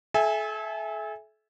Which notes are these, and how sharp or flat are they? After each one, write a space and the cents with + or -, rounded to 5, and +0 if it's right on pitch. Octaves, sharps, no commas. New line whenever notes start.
A4 -40 E5 +0 G#5 -15